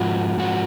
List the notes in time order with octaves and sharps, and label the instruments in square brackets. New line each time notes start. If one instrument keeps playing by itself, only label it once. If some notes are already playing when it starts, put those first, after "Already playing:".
Already playing: [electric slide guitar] G#2 F3 F#4 [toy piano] F4
[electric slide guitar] G#2 F3 F#4